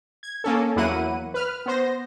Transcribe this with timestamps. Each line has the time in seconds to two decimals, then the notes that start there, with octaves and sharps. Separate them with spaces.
0.23 G#6
0.44 A#3 C#4 A4
0.76 E2 F#3 A#3 E4 F#5 D#7
1.34 B4 F6
1.66 B3 C5 A#6